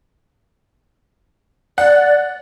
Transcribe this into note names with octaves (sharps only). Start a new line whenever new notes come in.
D5 F#5